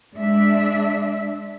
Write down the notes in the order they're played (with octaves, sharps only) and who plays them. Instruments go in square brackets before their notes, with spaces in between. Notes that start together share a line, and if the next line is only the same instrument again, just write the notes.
[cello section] G#3 D4 E5